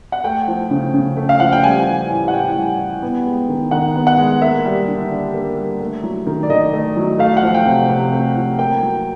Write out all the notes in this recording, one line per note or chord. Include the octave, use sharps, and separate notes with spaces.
F#5
A3 G5
F3
C#3
C#3
A3
F5
F3 F#5
G5
G3 G#5
E3
A2
F#5
A2 G5
G3
E3
B3
G#3
D#3
D#3 F#5
B3
F#5
G#3
A#3 E5
G3
D3
D3
A#3
G3
A3
F#3
D#3
D5
D#3 D#5
A3
F#3
A3 F5
F#5
F3
G5
C3
C3
A3
F3
A#3 G5
F#3